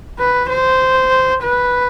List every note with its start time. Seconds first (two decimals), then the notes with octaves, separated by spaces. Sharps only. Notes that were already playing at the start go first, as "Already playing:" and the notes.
0.19 B4
0.49 C5
1.43 B4